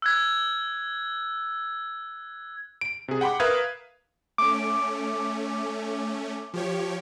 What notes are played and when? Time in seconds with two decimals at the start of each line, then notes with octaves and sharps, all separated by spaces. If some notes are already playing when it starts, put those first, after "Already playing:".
0.02 E6 F#6 G#6
2.81 D7
3.08 C3 G#4
3.21 F#5 G5 B5 C6 D6
3.40 A#4 B4 E5 F5 D#6 G#6
4.38 A3 C#4 D6
6.54 F3 G4 C#5